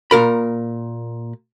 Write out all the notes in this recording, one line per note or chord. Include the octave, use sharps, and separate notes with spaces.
A#2 A#4 B5